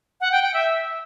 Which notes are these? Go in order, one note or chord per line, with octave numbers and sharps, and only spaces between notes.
F#5
G5
G5
E5